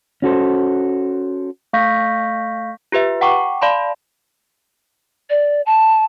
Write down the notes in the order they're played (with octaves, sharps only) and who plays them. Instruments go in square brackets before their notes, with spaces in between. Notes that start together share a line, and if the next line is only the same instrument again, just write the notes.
[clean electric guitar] C#4 F#4 A4 C5
[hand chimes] A3 F5 C#6 G6 A#6 B6
[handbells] F4 G4 B4 E5
F#5 G5 A#5 C#6 D6
D5 F5 A5 B5 C6
[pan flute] D5
A5